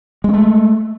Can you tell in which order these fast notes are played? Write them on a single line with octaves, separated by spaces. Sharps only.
G#3 C#4 A3